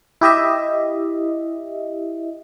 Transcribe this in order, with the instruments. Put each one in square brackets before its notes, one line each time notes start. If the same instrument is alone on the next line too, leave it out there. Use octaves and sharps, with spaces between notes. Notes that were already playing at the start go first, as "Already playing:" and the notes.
[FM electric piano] E4 G4 D#5 E5